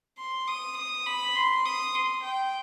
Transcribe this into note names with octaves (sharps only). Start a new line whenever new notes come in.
C6
D#6
D#6
B5
C6
D#6
C6
G5